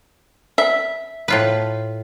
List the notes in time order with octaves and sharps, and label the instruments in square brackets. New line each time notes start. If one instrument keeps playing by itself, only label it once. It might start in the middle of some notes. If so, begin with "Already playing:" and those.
[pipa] E5
[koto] A2 F4 B4